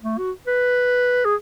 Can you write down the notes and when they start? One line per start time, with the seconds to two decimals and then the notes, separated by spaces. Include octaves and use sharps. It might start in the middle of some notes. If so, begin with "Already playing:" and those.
0.03 A3
0.18 F#4
0.47 B4
1.25 G#4